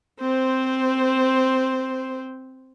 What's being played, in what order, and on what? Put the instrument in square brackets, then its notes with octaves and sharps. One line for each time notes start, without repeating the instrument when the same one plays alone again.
[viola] C4 C5